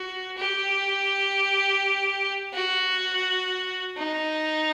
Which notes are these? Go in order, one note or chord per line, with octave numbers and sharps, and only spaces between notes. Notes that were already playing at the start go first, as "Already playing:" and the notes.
Already playing: F#4
G4
F#4
D#4